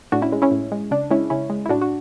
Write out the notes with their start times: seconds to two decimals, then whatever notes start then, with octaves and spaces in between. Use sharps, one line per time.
0.12 A2 D4 F#4
0.22 C#4 E4
0.32 G#3
0.42 C#4 E4
0.51 A2
0.72 G#3
0.91 C#3 D4
1.11 G#3 C#4 E4
1.30 C#3 C#4 E4
1.50 G#3
1.66 E4
1.69 A2 D4 F#4
1.81 F#4